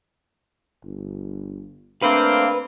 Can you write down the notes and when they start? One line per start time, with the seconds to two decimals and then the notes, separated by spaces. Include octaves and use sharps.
0.84 G1
2.02 D3 A3 A#3 C4 D4 B4 F5 F6